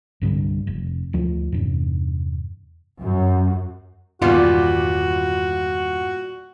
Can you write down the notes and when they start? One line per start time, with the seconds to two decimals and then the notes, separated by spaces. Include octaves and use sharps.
0.22 C2 G2 D3 G3
0.67 F1
1.13 D2 F3 A3
1.52 E2 G2 C3
3.02 F#2
4.22 E2 G2 A#2 D#3 G3 B3 F4 F#4